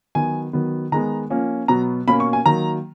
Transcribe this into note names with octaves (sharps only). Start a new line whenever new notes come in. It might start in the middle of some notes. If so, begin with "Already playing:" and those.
D#3 F#3 B3 G#5
D#3 F#3 B3
D#3 G#3 B3 A#5
F3 A#3 C#4
B2 F#3 B3 A#5
B2 A#3 C#4 B5
C#6
G#5
D#3 F#3 A#3 A#5